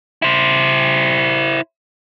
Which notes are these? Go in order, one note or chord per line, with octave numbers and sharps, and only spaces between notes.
E4 C5